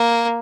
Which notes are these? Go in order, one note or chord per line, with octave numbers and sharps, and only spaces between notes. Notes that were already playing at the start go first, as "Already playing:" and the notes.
Already playing: A#3